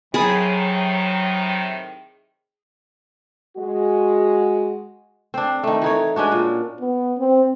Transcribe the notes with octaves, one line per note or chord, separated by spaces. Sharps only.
A2 C3 D#3 F#3 G#4 A5 B5
G#3 F#4
C4 D4
D#3 A3
E3 D#4 C#5
G#3 C#4 D4 F#4
A#2
B3
C4